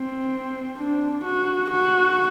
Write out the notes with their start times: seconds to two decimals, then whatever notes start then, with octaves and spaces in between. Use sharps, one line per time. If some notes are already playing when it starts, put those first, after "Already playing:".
Already playing: C4
0.78 D4
1.24 F#4
1.71 F#4